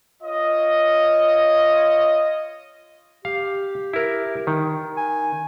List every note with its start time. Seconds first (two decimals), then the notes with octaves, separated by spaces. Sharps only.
0.22 F4 C#5 D#5
3.25 G4 F5
3.93 E4 A#4
4.47 D#3
4.97 G#5